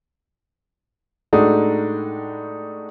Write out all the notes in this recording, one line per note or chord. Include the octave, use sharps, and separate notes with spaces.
A2 G#3 A3 D4 D#4 F#4